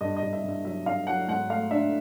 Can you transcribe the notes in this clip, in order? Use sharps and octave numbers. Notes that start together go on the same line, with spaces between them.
G2 D#5
D#5
G2
E5
G2
E5
F#3 E5
G2 F5
F#3 F#5
G#2 F#5
A3 F5
D4 E5